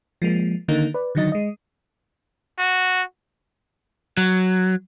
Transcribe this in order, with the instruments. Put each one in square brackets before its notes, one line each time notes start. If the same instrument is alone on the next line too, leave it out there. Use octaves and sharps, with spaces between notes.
[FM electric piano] F3 G#3 A#3
D3 D#3 A#3 D#4
B4 D5
D3 D#3 F#3 D#4 D#5 A6
G#3 D#5
[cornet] F#4
[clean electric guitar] F#3